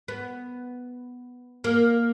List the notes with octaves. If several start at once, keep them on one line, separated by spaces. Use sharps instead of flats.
B3
A#3